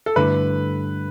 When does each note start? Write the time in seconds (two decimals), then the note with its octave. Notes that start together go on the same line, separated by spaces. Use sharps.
0.06 A4
0.16 G2 D3 A3 E4 B4